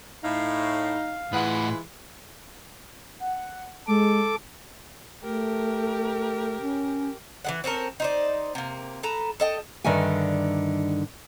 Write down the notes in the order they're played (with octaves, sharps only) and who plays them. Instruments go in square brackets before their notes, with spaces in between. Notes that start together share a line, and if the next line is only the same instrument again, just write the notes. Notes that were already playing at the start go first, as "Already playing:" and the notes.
[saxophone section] A2 [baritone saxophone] D#4 [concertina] F5
[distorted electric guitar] A2 F#5 [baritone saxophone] E3 [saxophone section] G#3 F4 B4
[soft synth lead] F#5
[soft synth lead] G#3 [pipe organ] A4 D6
[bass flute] A3 [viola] G4 A#4
[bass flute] C#4
[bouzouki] E3 G#3 F#5
C4 C#4 A4 A#4
D#4 C5 D5
C3 A#3
A4 B4 A#5
A4 D#5 G5
[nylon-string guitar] G2 D3 D#3 E5 G#5